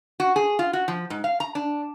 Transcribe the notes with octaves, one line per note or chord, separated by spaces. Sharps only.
F#4
G#4
F4
F#4
F3
G#2
F5
A#5
D4